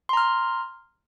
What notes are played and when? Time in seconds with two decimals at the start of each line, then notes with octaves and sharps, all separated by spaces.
0.09 C6
0.13 A#5
0.17 F6